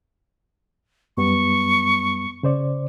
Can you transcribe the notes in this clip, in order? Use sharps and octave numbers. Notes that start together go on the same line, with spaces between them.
F#2 G3 B3 C#6
C#3 C5 D5